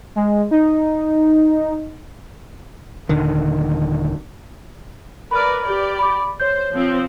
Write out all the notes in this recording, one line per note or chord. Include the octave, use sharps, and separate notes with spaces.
G#3
D#4
D#1 D3 D#3
A#4 B4 D5 B5 F6
G4 D5
B5 D6
C5 C#5 G6
F3 C4